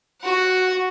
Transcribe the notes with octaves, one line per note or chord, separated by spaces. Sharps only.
F#4 F#5